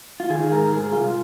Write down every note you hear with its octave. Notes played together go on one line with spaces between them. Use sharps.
F4
D#3 G#4
G#2 A#4
G#2 G#4
C2 F4